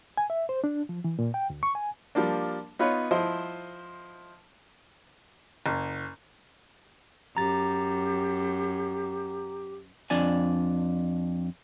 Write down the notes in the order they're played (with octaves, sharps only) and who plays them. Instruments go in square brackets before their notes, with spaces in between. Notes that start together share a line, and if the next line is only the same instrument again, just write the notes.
[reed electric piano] G#5
E5
C5
D4
F3
E3
A#2
G5
D2
C#6
G#5
[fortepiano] F3 G3 A#3 D4
B3 D#4 F4 B4 C#5
F3 E4 C5 D#5
[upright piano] F#1
[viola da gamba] F#2 [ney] G4 [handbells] A#5 A6
[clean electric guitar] F2 D4 D5 G#5